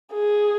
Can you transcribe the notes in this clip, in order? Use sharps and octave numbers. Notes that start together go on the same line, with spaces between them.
G#4